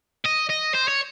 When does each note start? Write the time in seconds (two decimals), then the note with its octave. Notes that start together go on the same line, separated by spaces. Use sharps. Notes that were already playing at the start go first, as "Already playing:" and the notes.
0.25 D#5
0.49 D#5
0.74 C5
0.88 C#5